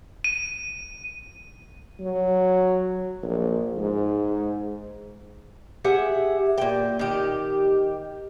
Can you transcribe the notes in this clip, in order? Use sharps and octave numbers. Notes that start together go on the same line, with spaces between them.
D#7
F#3
A#1
G#2
G4 G#4 E5 F#5
A#2 G5
D#3 G4